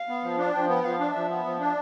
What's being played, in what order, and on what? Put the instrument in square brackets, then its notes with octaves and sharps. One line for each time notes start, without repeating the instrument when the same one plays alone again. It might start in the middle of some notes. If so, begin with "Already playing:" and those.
Already playing: [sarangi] F5
[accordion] B3
F3
D4
[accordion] F3 [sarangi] G5
[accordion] B3
[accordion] F3 [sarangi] F5
[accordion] D4
[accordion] F3 [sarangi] E5
[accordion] B3
F3
D4